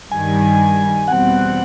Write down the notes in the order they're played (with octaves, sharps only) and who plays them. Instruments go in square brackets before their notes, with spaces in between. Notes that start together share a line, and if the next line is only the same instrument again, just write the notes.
[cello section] G2 D#3 G3 [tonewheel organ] G#5
[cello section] E2 B2 G3 C4 [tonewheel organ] F#5